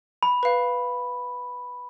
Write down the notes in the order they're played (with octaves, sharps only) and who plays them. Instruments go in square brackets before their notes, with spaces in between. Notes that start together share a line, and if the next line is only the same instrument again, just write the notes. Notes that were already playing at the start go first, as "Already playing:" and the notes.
[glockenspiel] B5
[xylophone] B4 F5